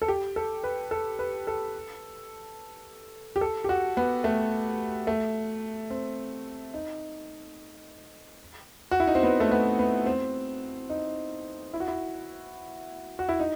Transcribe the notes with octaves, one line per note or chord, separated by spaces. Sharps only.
A4
G4
A4
B4
A4
B4
A4
G4
A4
G4
F#4
B3
A3
A3
C4
D#4
F#4
E4
D#4
C4
B3
A3
B3
B3
C4
D#4
E4
F#4
E4
F#4
E4
D#4